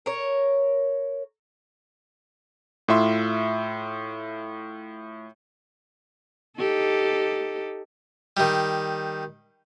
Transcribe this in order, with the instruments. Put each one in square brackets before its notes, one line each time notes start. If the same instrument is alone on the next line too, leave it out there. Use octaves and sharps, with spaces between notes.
[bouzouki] A#4 C#5
[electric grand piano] A2 F4 E5 C6
[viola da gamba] D#4 G4 A4
[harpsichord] D#3 G3